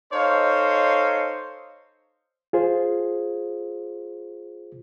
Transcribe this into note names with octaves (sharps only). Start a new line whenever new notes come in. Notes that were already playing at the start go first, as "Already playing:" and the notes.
D#4 A4 C5 C#5 D#5 F5
F4 G#4 C5